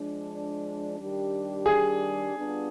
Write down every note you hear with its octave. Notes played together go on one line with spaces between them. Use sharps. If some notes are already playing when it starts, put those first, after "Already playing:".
Already playing: F3 G#3 D4
D#3 G3 D4 G4
G#4
G3 B3 D4 F4